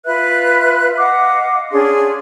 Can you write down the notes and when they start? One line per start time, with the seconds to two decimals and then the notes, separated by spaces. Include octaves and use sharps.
0.05 F4 B4 E5 F#6
0.97 D#5 F5 F#5 D6
1.71 C#4 D4 G#4 C6